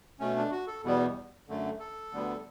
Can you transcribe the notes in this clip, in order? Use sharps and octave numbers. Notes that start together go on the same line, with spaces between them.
B2 A3 C#4
D4
F#4
A4
E2 B2 G3 B3
F#2 D3 A3
A4
D2 D3 G3 B3